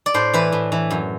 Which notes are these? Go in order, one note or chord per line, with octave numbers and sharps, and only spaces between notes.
D5
A2 C5
E3 B4
A2
E3
F#2